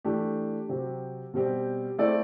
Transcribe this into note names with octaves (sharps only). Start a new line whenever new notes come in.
E3 A3 D4 G4
C3 F#3 C4 G4
B2 G3 C4 G4
A3 C4 E4 A4 D5